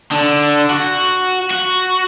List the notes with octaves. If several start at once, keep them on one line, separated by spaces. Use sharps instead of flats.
D3
F#4
F#4